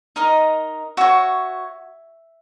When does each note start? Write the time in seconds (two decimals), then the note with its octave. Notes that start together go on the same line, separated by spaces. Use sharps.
0.16 D#4 A#4 D#5
0.97 F#4 C#5 E5